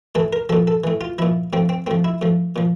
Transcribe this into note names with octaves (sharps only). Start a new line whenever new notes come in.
A2 E3 A4
A#4
A#2 F3 A4
A4
A2 E3
F4
A#2 F3 E4
A2 F3 C4
C4
A2 F3 C4
E4
A2 F3
A#2 F3